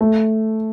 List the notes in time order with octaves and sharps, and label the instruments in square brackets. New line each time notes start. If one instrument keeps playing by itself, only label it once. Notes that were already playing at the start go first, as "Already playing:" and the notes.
[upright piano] A3